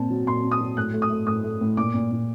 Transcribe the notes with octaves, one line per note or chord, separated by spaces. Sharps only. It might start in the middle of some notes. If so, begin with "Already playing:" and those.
Already playing: A#2 C4 A5
F#3
A#2 C6
C4
D#6
F#3
A2 F#6
A3
D#6
A3
A2 D#6
A3
A2
A#2 D6
A#2
A#2